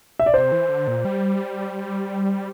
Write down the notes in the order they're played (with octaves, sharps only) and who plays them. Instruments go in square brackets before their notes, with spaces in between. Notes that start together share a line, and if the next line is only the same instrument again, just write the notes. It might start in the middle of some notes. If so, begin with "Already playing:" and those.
[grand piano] E5
D5
[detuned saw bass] C3 [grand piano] C5
[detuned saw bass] E3
D3
A#2
G3